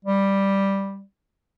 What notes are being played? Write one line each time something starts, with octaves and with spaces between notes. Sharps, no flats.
G3